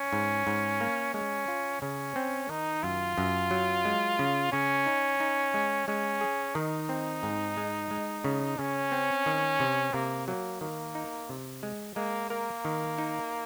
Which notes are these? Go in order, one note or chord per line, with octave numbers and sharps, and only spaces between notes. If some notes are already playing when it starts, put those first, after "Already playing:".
Already playing: C#4
G#2
G#2
A#3
G#3 C#4
F4
C#3 C#4
C4
D#3 D#4
F#2 F4
F#2
F#3
G#3
C#3
C#3 C#4
D#4
D#4
G#3
G#3 C#4
G#4
D#3 D#4
C4
G#2
G#3
G#3
C#3
C#3 C#4
C4
D#3
C3
C3 A#3
F#3 A#3
D#3 A#3
D#4
C3
G#3
G#3 A#3
A#3 A#4
D#3
D#4